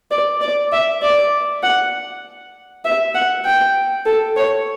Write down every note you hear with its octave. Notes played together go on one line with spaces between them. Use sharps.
D5
D5
E5
D5
F#5
E5
F#5
G5
A4
C#5